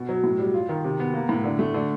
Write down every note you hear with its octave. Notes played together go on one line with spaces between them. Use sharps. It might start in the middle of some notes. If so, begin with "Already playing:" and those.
Already playing: B2
F#3
A2
G3
F4
D#3
C3
B3
A#3
A2
D3
A3
D3